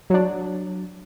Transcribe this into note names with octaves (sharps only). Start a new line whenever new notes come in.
F#3 D4